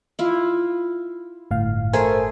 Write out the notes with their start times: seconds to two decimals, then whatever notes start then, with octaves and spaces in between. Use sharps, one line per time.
0.19 E4 F4
1.51 G1 A2 F5
1.93 A3 G#4 A#4 C5 G#5